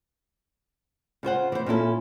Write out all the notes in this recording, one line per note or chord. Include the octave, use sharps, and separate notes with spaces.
C#3 F4 C5 F#5
E3 C5
A#2 C#4 E4 A4